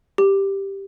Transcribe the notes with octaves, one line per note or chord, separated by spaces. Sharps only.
G4